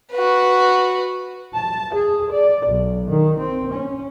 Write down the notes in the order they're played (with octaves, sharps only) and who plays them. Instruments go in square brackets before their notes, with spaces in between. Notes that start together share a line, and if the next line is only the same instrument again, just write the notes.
[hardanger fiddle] F#4 B4
[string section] A5
G#4
D5
B1
D#3
C4
C#4